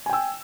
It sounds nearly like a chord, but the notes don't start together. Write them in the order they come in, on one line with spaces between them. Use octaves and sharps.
G#5 G5 E6